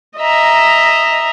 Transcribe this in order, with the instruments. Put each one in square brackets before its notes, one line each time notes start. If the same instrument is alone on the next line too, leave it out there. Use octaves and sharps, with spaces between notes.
[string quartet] D#5 E5 A#5